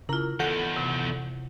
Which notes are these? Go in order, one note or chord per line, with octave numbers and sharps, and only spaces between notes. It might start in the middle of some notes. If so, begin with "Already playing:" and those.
C#3 E4 F4 A#4 A#5
E2 D#3 A4 F#5 G6
C3